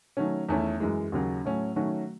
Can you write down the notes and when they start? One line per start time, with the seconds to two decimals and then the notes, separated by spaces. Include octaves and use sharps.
0.17 D#3 F#3 A3 C#4
0.49 E2 D#3 A3 C#4 E4
0.80 F#2 E3 G#3
1.12 D#2 C#3 F#3
1.45 A2 F#3 A3 C#4
1.76 D#3 F#3 A3 C#4 F#4